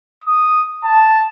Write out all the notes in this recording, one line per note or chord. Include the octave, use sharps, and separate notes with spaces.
D#6
A5